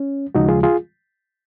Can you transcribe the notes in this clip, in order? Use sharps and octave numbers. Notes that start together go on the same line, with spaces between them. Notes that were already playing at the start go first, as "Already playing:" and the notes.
Already playing: C#4
D#2 C#3 F3 G#3 D#4 F#4
F4 G#4
F4 G#4